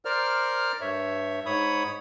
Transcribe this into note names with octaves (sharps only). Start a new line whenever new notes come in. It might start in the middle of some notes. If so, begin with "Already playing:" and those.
A#4 C5 D5 F6
G2 C#5 E5
G#2 C#5 B5 D#6